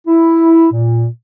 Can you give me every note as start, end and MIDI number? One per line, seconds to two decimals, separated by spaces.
0.07 0.68 64
0.72 1.07 46